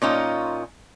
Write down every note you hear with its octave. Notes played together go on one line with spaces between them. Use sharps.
A#2 C#4 D#4 F4